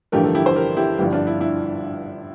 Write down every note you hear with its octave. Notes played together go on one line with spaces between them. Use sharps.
A1 G2 D3 F3 A3 G4 A#4
A4
E4 G4
C5
G4 A#4
E4 G4
G1 G2 F3 E4 G4
D4 F4
E4
E4